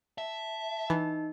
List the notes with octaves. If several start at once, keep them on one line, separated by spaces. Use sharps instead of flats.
E5 A5
E3 D#4